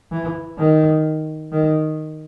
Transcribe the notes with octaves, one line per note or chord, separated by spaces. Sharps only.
E3
D#3
D#3